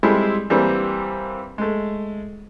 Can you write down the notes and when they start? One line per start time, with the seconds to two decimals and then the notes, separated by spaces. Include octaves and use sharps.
0.03 G3 G#3 C4 E4 G#4 A4
0.50 E3 G3 A#3 C4 D4
1.58 G#3 A3